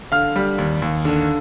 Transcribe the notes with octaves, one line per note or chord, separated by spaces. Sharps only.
D3 F5 F6
G3
D#2
D#2
D3